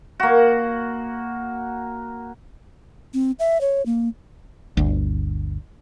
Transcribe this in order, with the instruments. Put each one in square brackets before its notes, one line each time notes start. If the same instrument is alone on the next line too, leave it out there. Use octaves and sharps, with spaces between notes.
[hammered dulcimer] A#3 F#4
[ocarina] C4
E5
C#5
A#3
[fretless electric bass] G1 D2